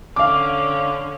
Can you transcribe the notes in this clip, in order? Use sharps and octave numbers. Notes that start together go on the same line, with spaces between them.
D3 C#4 F5 D6